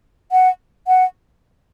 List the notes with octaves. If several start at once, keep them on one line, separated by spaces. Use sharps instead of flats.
F#5
F#5